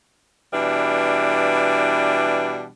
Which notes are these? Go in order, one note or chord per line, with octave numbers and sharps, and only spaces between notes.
B2 E3 G3 D4